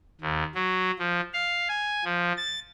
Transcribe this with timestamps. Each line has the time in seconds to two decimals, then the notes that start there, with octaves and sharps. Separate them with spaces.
0.21 D#2
0.55 F#3
0.99 F3
1.34 F5
1.69 G#5
2.04 F3
2.37 A6